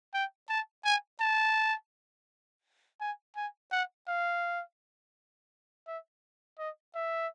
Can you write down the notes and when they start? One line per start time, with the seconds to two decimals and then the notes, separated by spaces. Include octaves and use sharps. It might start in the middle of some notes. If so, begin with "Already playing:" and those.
0.14 G5
0.49 A5
0.85 G#5
1.21 A5
3.01 G#5
3.36 G#5
3.72 F#5
4.08 F5
5.87 E5
6.59 D#5
6.95 E5